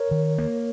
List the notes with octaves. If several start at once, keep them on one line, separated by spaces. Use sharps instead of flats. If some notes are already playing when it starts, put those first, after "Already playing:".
Already playing: A#4 C#5
D#3
A#3